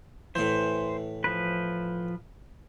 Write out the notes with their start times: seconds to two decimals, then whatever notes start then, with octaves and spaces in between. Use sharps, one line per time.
0.35 A2 E3 C5
1.24 F3 B4